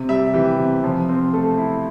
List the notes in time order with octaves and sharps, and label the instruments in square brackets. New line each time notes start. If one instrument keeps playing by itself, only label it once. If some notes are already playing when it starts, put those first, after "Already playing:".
Already playing: [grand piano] C3
G3 E5
E3 G4
C3
F3
C4
A3 A4
E4